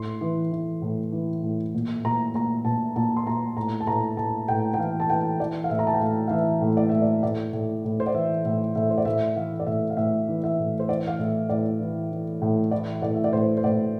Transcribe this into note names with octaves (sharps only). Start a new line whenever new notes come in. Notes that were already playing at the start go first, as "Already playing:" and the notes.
Already playing: A2 C6
E3
E3
A2
E3
A2
A#2
A#2 A#5
A#2 A#5
A#2 A5
A#2 A5
C6
A#2 A#5
A2 A#5
A5
A2 A#5
A2 A5
A2 G5
G5
E3 F5
A5
E3 G5
E3 D5
F5
A2 E5
A#5
A5
G5
A2 F5
F5
E3 E5
A2
D5
A2 E5
D5
A2 D5
A2
A2
C5
D5
E3 E5
A2 E5
A2 E5
C5
D5
A2 E5
E3 F5
D5
A2 E5
F5
A2 E5
E3
E5
A2
C5
E3 D5
F5
A2 E5
A2 D5
E3
E3
A2
E3 D5
A2 D5
E5
D5
A2 C5
C5
A2 D5